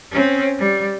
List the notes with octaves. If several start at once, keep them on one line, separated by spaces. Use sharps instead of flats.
C4 C#4
G3